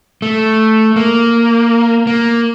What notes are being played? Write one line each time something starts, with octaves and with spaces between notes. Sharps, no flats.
A3
A#3
A#3